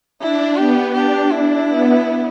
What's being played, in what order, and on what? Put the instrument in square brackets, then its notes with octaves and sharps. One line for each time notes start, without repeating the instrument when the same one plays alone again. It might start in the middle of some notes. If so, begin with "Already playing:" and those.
[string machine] D4 [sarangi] E4
[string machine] B3 [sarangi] G4
[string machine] D4 [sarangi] G4
[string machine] D4 [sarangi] E4
[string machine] B3